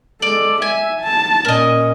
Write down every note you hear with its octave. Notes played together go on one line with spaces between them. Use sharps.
G#3 A4 D5
E5 G#5
A5
A#2 C#4 A#4 D#5